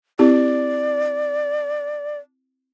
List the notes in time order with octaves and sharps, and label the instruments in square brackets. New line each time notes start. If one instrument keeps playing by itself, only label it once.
[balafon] C4 E4 G4 [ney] D5